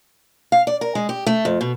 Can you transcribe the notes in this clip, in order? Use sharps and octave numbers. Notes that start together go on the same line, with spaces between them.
F5
D5
A#4
G#3
G4
A3
F2
B2